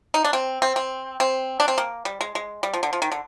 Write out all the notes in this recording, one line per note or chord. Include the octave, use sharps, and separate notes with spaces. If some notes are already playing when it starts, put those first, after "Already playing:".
D#4
D4
C4
C4
C4
C4
D4
C4
A#3
G3
G#3
G#3
G3
F3
D3
F3
D#3
D3